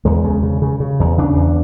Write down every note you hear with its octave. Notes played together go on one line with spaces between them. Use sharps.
E2 G#3
C#3
C#3
C#3
C#3
E2
C#3 D4
E2